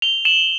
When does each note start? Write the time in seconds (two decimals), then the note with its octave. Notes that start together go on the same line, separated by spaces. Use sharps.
0.02 F7 G7
0.25 E7 F#7